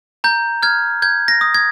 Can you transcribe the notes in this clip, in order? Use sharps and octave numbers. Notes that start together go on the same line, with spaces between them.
A#5 G6
F6 G#6
G6 G#6
A#6
D#6
G#6